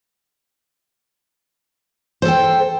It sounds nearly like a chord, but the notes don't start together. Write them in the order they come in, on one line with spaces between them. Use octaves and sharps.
C5 A4 G5